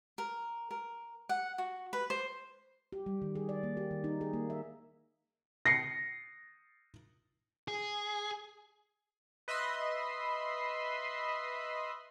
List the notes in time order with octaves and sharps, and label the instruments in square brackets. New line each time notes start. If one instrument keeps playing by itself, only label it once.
[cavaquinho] A#4
A#4
F#5
F#4
B4
C5
[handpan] G4
G3
D#3
G#4
D5
A#3
G4
D#3
D#4
G#4
A#3
E5
[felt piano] A#6 C7 C#7
[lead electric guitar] G#4
[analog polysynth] B4 D#5 E5 B5 C6